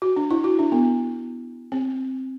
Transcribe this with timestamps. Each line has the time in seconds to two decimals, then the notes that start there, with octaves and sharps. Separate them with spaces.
0.02 F#4
0.16 D4
0.31 E4
0.44 F#4
0.59 D4
0.72 B3
1.72 C4